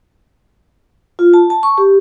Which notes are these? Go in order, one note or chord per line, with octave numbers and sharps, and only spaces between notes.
F4
A5
A5
C#6
G4